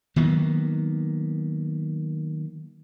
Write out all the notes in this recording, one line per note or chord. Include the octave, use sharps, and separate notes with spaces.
D#3 F#3 A#3 B3